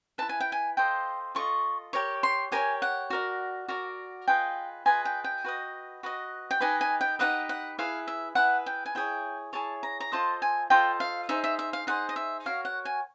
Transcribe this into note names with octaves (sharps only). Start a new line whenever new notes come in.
E4 G#4 B4 A5
G#5
G5
G#5
F4 A4 C5 D#5 G5
F4 A4 D#5 C#6
G4 A#4 C#5 C#6
C6
G4 A#4 C#5 G#5
F#5
F#4 A#4 D5
F#4 A#4 D5
F4 G#4 B4 D#5 G5
F4 G#4 B4 D#5 G#5
G5
G5
F#4 B4 D#5
F#4 B4 D#5
G5
D#4 G4 B4 D#5 G#5
G#5
G5
D#4 G4 B4 D#5 F#5
F#5
E4 G#4 B4 F5
E5
E4 G#4 B4 F#5
G5
G#5
E4 G#4 C#5 G5
E4 G#4 C#5 A5
A#5
A#5
F4 A4 C5 D#5 A5
G#5
F4 A4 C5 D#5 G5
F5
D#4 G#4 C5 E5
E5
E5
F5
D#4 G#4 C5 F#5
D#5
E5
F#4 A#4 C#5 F5
F#5
G#5